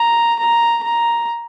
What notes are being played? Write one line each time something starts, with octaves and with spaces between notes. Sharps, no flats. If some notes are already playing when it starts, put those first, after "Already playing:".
Already playing: A#5
A#5
A#5